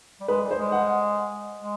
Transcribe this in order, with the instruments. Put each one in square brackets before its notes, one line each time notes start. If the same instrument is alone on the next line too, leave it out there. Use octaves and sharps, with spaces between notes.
[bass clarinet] G3
[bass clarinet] G#3 [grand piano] B4
[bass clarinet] G3
[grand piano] C5
[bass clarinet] G#3
[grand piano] F#5
[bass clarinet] G#3